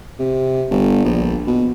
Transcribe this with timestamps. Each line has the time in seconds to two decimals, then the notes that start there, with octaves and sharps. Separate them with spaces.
0.19 C3
0.70 G1
1.04 A#1
1.47 B2